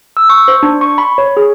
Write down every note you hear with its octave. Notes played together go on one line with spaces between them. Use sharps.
E6
C#6
C5
D4
C#6
B5
C#5
G#4